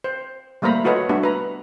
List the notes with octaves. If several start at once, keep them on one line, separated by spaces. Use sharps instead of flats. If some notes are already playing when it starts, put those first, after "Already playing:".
C5
G3 A3 A#3 C5 A#5 B5
F4 F#4 A4 B4 C#5 D#5
G3 A3 B3 D4 F#4 E5
B4 A#5